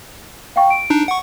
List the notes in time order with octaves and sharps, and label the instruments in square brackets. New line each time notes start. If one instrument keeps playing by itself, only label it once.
[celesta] F5 G5 C#6
D7
[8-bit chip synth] D4 D#4
F#5 C#6